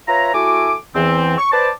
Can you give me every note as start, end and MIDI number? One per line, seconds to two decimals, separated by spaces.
0.08 0.31 65
0.08 0.31 71
0.08 0.31 73
0.08 0.31 76
0.08 0.31 82
0.34 0.75 57
0.34 0.75 64
0.34 0.75 66
0.34 0.75 80
0.34 0.75 86
0.95 1.35 40
0.95 1.35 52
0.95 1.35 60
1.38 1.50 85
1.52 1.69 71
1.52 1.69 72
1.52 1.69 74
1.52 1.69 81